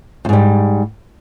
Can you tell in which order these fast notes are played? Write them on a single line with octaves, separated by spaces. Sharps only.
F2 G#2 G3